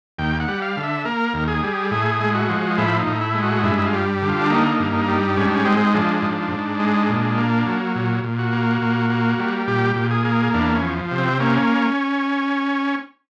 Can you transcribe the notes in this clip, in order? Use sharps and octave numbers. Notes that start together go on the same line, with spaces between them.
D#2 G5
F#5
G3
F5
D3
E5
A#3 A#4
D#2
G#4
G3
A2 G#4
G#3
F#4
F3
A2 E4
D#4
A2
E4
G#3
F#4
G2 E4
E4
F4
G3
D3
F4
D4
A#3 D#4
G2
D#4
G3
G#2 C#4
D4
C#4
G#3 C4
F3 D4
G#2
G#2
G#3
A#2
A#3
F#3
A#2
A#2
F#4
A#3
A#2
A#3
G3
A#2 G4
A#2
G#4
A#3
E2 D4
C#4
F3
C3
C4
A#3 C#4